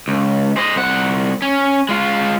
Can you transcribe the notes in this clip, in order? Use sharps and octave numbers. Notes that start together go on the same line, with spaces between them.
C#2
C5 D#5
C2 F#5
C#4
G#3 F4